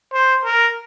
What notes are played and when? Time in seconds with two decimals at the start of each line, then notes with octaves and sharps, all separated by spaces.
0.13 C5
0.44 A#4